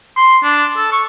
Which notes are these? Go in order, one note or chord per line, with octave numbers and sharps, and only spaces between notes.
C6
D4
A4
C#6